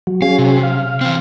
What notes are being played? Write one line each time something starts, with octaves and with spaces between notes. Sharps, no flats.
F#3
F#3 C#4 G#4 F5
C3
F5
E3 C4